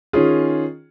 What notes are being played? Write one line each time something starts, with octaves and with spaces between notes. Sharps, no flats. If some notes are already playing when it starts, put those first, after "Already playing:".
D#3 C#4 F4 G#4